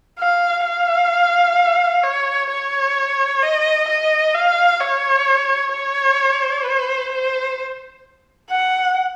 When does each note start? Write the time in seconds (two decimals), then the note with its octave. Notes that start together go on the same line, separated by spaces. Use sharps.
0.20 F5
0.65 F5
2.04 C#5
2.51 C#5
3.43 D#5
3.89 D#5
4.35 F5
4.81 C#5
5.73 C#5
6.66 C5
7.12 C5
8.50 F#5